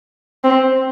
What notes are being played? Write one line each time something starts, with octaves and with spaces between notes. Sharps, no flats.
C4